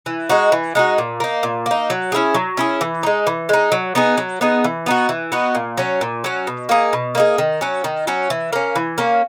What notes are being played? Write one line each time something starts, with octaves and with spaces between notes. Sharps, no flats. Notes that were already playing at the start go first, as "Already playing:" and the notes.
E3
G#3 D#4 F#4
E3
G#3 D#4 F#4
A#2
A#3 D#4
A#2
A#3 D#4
F#3
C#4 E4 G#4
F#3
C#4 E4 G#4
E3
G#3 D#4
E3
G#3 D#4
F#3
B3 D#4 G#4
F#3
B3 D#4 G#4
E3
B3 D#4 F#4
E3
B3 D#4 F#4
A#2
F#3 C#4
A#2
F#3 C#4
B2
A#3 D#4 G#4
B2
A#3 D#4 G#4
D#3
F#3 C#4
D#3
F#3 C#4
E3
A#3 C#4
E3
A#3 C#4